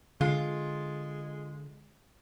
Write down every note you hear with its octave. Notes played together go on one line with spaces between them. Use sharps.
D3 G#3 F4